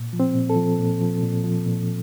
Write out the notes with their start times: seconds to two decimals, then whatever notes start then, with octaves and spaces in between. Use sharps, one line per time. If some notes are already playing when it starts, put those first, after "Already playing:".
Already playing: A#2
0.13 F3
0.20 C4
0.35 A#2
0.50 A4
0.56 F3
0.79 A#2
1.01 F3
1.22 A#2
1.44 F3
1.66 A#2